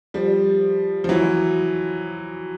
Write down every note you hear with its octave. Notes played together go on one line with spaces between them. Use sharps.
F3 G3
F3
E3 F#3